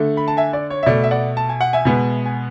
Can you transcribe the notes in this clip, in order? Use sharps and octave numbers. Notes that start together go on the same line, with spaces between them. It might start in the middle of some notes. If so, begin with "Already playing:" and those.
Already playing: D3 A3
B5
A5
E5 G#5
D5
C#5
E5
B2 A3 D5
E5
D5 F#5
A5
G#5
F#5
E5 G#5
B2 G#3 B3
G#5